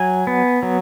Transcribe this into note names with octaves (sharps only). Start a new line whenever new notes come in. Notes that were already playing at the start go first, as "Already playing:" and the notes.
Already playing: F#3 G#5
B3
F#3